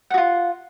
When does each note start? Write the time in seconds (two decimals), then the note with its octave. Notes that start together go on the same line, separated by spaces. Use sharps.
0.10 F#5
0.14 F#4
0.18 F4